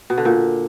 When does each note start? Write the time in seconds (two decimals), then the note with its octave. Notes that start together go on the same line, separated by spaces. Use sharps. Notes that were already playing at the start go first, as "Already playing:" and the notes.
0.10 B2
0.18 D3
0.25 A#2